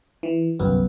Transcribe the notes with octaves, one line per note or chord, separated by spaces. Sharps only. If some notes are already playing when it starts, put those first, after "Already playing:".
E3
G1 C2 F#2 B3